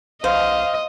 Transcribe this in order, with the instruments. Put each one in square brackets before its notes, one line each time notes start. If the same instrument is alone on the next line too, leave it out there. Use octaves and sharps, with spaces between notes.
[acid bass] B1 [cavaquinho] C5 [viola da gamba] D#5 [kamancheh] F5